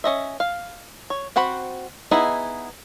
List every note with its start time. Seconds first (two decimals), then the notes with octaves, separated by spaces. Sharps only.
0.04 C#4 D#5 E5
0.40 F5
1.10 C#5
1.36 C4 F#4 F#5 B5
2.11 B3 D#4 E4 G#4